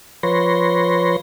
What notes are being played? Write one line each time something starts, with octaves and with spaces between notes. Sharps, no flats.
F3 B4 C#5 C6 A#6